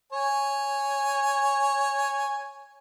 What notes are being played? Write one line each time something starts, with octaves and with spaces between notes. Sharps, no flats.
C#5 G#5